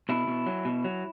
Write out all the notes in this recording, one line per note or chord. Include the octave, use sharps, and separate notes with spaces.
B2 E4
B2
F#3
B2
F#3